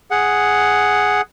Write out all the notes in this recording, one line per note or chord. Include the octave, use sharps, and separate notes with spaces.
G#4 F#5